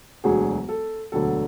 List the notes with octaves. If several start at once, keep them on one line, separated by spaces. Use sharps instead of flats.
E1 D2 D3 F#3 G#4
A4
E1 D2 D3 F#3 A4